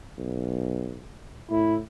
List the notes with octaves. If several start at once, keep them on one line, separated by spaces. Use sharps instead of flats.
B1
A2 E4